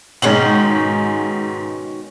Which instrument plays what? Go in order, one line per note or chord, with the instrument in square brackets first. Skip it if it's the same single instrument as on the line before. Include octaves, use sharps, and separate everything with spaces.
[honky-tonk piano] G#2 G#3 F#7 [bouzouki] B2 D#3 C#4